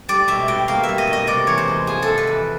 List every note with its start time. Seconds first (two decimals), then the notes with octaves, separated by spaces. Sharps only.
0.08 G3 D5
0.28 B2 E5
0.48 B2 G5
0.68 A#3 F5
0.83 E5
0.89 G3
0.98 D#5
1.07 B2
1.13 D#5
1.27 C3 D5
1.47 E2 C#5
1.58 C5
1.68 G#3
1.87 F3 G#4
2.02 A4
2.08 C3
2.18 B4
2.27 E2